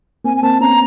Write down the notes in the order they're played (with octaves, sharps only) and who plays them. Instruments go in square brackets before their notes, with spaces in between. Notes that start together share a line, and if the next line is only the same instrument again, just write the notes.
[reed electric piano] A#3 C4 [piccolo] G#5
[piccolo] G#5
[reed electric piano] A#3 C4 [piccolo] A5
[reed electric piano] B3 C#4 [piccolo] A#5